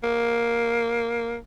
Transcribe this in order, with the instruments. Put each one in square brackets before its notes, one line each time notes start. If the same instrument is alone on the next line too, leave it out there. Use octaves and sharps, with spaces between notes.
[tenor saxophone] A#3